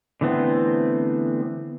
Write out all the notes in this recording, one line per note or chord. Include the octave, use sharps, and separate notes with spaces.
D3 E3 A3 B3 C4